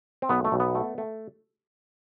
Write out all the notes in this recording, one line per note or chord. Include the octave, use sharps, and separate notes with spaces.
C4
B1 B3
A3
B1
B3
A3
A3